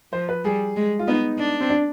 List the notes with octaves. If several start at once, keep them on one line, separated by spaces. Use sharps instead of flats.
F3 C5
B4
G3 G#4
G#3
F4
B3 D#4
D4
C4
D4